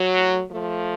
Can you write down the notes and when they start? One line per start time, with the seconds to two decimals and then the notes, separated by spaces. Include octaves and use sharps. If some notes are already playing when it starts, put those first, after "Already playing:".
Already playing: F#3
0.14 A2
0.50 F3 A3